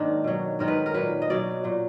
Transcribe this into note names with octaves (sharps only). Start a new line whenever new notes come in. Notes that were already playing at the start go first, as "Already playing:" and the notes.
Already playing: G#2 D#3 F#3 A#3 D4
B2 F#3
G#2 D#3 F#3 A#4
B4
A#4
A#2 F#3 B4
D#5
B2 F#3 D5
A#2 F#3